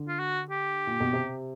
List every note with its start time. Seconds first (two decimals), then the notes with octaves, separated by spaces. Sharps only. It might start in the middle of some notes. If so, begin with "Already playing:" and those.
Already playing: D3
0.08 F4
0.19 F#4
0.50 G4
0.87 A#2
1.00 B2
1.13 C3